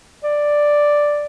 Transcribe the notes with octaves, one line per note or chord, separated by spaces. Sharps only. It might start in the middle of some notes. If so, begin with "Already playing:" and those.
D5